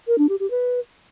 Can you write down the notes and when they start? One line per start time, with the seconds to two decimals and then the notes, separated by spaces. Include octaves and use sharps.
0.07 A#4
0.18 D4
0.29 G4
0.40 G4
0.51 B4